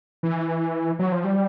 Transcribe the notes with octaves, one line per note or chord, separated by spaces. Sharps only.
E3
F#3
F3
G3